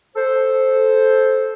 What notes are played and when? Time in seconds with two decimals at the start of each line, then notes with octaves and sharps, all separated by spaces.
0.16 A4 C5